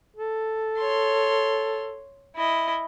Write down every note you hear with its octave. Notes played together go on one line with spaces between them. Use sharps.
A4
C#5 C6
E4 D#5